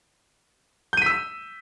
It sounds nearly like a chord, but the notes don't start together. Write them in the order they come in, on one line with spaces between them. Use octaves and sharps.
G6 D#7 B6 E6